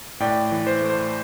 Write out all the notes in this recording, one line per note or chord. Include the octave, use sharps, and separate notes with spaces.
A2 D5 G5
E3
C5
A3
C5